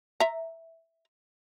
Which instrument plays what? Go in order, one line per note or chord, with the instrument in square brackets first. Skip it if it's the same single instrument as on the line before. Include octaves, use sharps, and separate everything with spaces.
[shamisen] E5 A#5